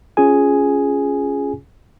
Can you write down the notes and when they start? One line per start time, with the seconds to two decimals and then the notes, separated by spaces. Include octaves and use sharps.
0.17 C#4 F4 G#4 G#5